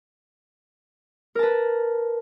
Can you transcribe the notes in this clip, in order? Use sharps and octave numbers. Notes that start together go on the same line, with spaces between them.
A#4 B4 A5